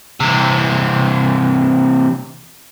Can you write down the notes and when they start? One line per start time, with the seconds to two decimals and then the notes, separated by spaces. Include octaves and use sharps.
0.20 C3 E3